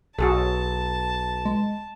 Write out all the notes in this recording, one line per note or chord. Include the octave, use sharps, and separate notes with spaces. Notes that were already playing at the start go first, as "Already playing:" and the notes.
B1 F#4 G#4 A4 A5
G#3